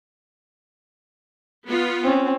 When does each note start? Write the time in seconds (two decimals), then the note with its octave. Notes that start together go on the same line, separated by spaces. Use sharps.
1.68 B3 F4
2.04 C4 C#4